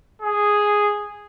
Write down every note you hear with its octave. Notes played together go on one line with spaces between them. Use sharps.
G#4